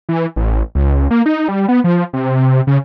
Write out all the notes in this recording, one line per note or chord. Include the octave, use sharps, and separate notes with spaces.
E3
A1
C#2
A#3
D#4
G3
B3
F3
C3
C#3